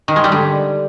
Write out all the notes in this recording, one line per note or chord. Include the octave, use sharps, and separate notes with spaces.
D#3
G#3
G3
D3